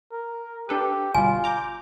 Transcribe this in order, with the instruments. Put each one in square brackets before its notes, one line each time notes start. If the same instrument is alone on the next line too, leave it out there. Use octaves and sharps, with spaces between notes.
[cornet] A#4
[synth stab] D4 A4 B4 [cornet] G4
[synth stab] G1 B2 G3 [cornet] F4 [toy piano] G#5
[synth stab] A#5 D6 G6